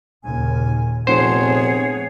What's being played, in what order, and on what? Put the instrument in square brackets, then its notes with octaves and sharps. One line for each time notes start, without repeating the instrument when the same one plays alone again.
[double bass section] D#2 A#2 C#3 [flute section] G#5
[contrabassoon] F1 [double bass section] A#2 F3 B3 [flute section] G#4 C#5 F#5 [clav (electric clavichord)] C5